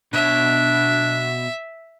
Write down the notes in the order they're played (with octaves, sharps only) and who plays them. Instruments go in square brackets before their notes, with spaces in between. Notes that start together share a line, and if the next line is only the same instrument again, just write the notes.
[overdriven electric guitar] B2 C#5 [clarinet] D4 [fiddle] E5